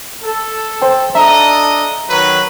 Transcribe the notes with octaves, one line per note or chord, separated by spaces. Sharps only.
A4
C5 G5
D4 A4 D#5 E5 A#5
D#3 F#3 B4